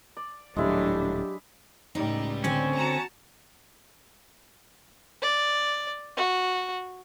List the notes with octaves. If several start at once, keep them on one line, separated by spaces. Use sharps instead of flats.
D5
D#1 A2 F#3 G#3 D4 E4 G4
C#2 A2 G3 D#4
D3 C4 C#4 C5
F#4 A5 A#5
D5
F#4